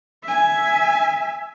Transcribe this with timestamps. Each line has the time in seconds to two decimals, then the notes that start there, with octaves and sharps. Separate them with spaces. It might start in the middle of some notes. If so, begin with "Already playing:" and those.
0.23 E5 G#5